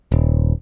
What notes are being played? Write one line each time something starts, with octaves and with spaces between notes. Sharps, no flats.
D#1